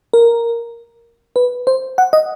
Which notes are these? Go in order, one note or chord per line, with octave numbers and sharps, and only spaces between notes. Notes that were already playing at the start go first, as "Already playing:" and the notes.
A#4
B4
C5
F#5
D#5